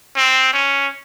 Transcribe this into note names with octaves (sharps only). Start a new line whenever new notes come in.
C4
C#4